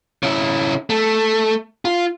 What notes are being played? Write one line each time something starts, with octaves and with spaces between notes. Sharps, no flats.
C#3 E4
A3
F4